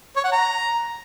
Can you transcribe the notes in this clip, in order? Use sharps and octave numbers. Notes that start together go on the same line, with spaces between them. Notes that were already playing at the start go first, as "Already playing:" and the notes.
C#5
F#5
A#5